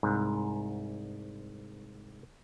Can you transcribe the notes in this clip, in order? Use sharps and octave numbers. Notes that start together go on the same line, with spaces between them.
C2 G#2